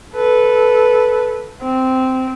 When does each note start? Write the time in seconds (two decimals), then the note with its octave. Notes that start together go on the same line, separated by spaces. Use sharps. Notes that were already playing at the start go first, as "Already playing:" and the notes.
0.14 A4 B4
1.62 C4